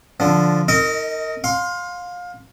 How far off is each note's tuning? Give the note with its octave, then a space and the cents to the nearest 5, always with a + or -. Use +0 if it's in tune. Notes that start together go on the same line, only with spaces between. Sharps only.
D3 -5 F3 +0
D#4 +25 A#4 -25 D#5 -10
F5 +25 C6 +0